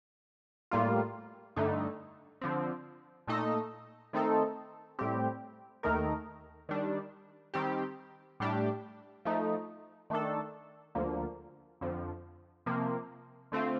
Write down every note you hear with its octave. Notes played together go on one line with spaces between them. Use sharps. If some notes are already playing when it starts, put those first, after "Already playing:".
A2 G3 A#3 F4
G2 D3 A3 D#4
D3 F3 C4
A#2 A3 D#4 A4 D#5
D#3 A3 C4 D#4 A4
A2 G3 C4 G4
D#2 D#3 A3 D#4 A#4
D#3 G3 D4
D#3 G3 C4 G4
A2 G3 D4 G4
F3 A3 D#4
D#3 A3 D4 A4
D2 D3 F3 A#3
F2 D3 F3
C3 F3 A#3
D3 A3 C4 F4